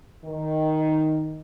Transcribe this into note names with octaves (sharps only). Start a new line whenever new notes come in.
D#3